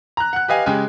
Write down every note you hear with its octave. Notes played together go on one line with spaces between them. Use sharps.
A#5 F#6
F#5 F#6
G4 B4 D#5 F5 G#5
C#3 G#3 G4 G#5